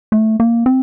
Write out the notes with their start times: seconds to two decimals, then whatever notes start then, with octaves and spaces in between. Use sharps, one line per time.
0.12 A3
0.40 A#3
0.66 C4